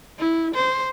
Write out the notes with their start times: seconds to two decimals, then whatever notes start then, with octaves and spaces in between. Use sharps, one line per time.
0.19 E4
0.55 C5